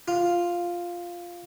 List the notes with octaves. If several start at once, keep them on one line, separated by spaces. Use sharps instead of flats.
F4